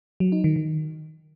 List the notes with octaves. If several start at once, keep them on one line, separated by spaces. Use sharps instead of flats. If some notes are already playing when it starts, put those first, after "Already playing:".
F#3
D#4
D#3
D#3